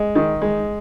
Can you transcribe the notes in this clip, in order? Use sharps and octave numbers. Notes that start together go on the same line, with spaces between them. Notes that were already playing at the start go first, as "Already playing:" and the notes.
Already playing: G#3
D#3
G#3